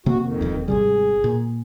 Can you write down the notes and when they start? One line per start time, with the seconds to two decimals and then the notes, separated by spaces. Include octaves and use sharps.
0.06 C3 A#3 C4 F#4
0.22 F2 D#3
0.41 D#1 D#2
0.68 G#1 C3 G3 G#4
1.24 A#2